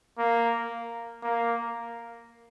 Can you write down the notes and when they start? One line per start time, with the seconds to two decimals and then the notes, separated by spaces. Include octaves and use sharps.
0.18 A#3
1.23 A#3